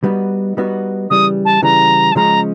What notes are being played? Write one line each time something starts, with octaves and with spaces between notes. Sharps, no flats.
G3 B3 D#4 F#4
G3 B3 D#4 F#4
C#3 E3 G3 D#6
A5
C#3 E3 G3 A#5
A5
C#3 F3 G#3 C#4 A#5